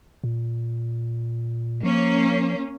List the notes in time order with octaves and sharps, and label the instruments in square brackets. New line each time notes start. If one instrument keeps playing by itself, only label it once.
[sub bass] A#2
[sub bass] F3 [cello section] A#3 C#4